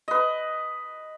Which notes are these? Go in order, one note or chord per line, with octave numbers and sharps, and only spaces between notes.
B4 D#5